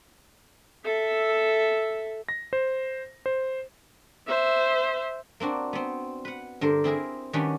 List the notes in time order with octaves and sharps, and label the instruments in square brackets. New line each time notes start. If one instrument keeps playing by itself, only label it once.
[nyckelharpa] A4 E5
[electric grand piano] A#6
C5
C5
[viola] C5 E5
[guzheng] A#3 C4 D4 F#4
B3 C4
B4 F#5
G2 D3 A#4 C5
C4 E4 G#4 A#4
D#3 G3 C#4 D4 F#4 B4